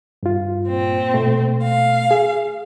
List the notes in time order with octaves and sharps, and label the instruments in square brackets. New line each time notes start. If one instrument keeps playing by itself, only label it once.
[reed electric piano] G2 F4
[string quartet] A#2 C4
[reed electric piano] B2 A3
[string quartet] F5
[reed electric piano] G#4